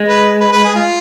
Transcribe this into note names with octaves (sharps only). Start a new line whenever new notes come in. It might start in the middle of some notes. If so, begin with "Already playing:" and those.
Already playing: G#3
B4
B4
B4
G#4
F4